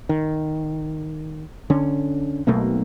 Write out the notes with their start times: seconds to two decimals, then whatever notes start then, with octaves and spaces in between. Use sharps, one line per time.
0.09 D#3
1.70 D3 C#4
2.47 B1 B2 A3 A#3